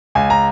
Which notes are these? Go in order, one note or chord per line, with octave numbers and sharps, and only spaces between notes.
C#2 G#5
A#5